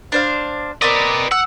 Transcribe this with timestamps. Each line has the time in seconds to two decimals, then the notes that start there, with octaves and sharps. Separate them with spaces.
0.12 D4 C5 F5
0.82 C4 A#4 B4 D5 D#5
1.32 F#5 E6